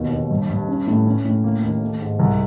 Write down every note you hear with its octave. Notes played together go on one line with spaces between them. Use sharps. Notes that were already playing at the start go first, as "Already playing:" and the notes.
Already playing: D#2 B2
D#2
G2
G2
C#4
A2
C#4
A2
A#3
D#2
A3
G#2
C2